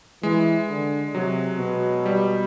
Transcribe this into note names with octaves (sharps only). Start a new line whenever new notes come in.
E3 G#3
D3
C3 F#3
B2
G3